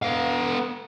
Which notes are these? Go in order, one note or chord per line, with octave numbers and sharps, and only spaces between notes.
B3 F5